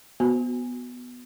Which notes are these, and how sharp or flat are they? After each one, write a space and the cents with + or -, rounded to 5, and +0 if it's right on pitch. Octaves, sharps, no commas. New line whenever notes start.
B3 +0 F#4 +0